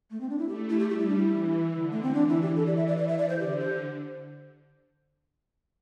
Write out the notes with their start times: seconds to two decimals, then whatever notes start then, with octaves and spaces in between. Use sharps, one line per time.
0.11 A3
0.21 C4
0.30 D4
0.39 E4
0.48 A3 G4
0.69 E4
0.80 G4
0.90 G3 G4
0.99 E4
1.08 D4
1.17 E4
1.32 E3
1.74 D3
1.91 A3
2.03 C4
2.15 E3 D4
2.29 E4
2.42 G4
2.56 E3 A4
2.67 D5
2.77 E5
2.88 D5
2.98 D5
3.08 E5
3.18 D5
3.29 C5
3.40 D3 G4
3.60 C5